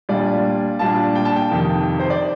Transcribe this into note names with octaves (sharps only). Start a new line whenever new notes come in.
A#2 G3 D4 F4 D5
A#2 G3 D4 F4 A5
G5
A5
G5
F2 C3 D#3
C5
D5